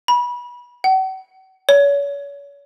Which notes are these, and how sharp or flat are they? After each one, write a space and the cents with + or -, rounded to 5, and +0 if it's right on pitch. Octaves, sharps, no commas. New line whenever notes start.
B5 -25
F#5 +45
C#5 +35